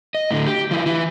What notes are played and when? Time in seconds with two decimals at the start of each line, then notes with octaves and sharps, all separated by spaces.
0.15 D#5
0.31 A2 D3
0.46 G4
0.71 F3 E4
0.86 E3 E4